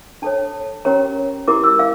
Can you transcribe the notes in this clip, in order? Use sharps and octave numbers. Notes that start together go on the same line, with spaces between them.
D4 A4 C#5 A5
C#4 G4 A#4 C#5 A#5
E4 G4 A#4 D6
E6
F5